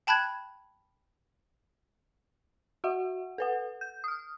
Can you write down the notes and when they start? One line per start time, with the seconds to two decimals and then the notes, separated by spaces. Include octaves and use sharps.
0.07 G5 A5 B5 F#6 G#6
2.84 F#4 E5 F#5
3.38 A4 B4 F#5
3.81 G6
4.04 D#6 F6